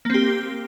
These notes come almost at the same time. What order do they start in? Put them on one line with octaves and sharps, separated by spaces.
A#3 C4 G4